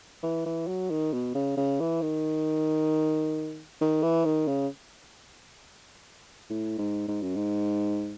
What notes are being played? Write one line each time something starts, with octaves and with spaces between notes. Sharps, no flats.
E3
E3
F#3
D#3
B2
C#3
C#3
E3
D#3
D#3
E3
D#3
C#3
A2
G#2
G#2
F#2
G#2